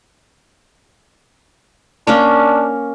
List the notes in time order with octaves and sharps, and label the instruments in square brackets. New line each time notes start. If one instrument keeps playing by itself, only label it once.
[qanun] A#3 C#4 C#5 [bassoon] D4